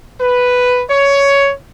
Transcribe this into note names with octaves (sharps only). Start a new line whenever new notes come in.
B4
C#5